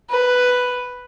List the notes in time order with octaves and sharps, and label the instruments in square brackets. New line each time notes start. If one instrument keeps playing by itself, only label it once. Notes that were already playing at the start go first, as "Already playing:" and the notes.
[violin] B4